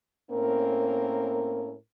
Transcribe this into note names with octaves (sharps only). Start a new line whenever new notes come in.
A2 A#3 C4 C#4 A#4